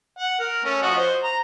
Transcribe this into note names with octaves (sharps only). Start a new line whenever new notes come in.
F#5
A#4
A3 C#4
F3 F#4 D#5
C5
A#5